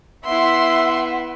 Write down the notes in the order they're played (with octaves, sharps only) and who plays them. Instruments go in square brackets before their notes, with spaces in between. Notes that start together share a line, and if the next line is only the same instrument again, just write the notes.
[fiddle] B3 E4 [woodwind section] E5 [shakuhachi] F#5 [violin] C6